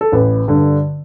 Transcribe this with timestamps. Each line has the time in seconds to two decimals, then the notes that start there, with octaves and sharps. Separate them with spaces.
0.01 A4
0.12 A1 B4
0.48 G2 D3